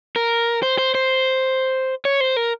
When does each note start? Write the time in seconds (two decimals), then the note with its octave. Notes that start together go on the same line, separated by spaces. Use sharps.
0.16 A#4
0.63 C5
0.79 C5
0.95 C5
2.05 C#5
2.21 C5
2.37 A#4